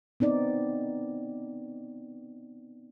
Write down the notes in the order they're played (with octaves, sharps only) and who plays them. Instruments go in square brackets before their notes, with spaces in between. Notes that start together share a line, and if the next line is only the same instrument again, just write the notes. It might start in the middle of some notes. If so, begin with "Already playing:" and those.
[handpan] B3 C4 D#4 D5